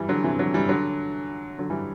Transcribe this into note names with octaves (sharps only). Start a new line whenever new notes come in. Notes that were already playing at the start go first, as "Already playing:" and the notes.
Already playing: E3 G3
D3 F#3
C3 E3
D3 F#3
E3 G3
D3 F#3
D3 F#3
E3 G3